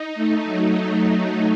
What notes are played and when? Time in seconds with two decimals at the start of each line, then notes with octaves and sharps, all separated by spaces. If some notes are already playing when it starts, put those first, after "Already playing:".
Already playing: D#4
0.15 A3
0.45 F#3